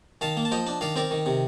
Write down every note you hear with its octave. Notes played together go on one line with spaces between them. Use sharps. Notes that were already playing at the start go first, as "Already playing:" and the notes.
D#3 F5 A5
A#3
A5
F3 D#5 G5
D4
D#3 D5 F5
C4 A#4 D5
D#3
C3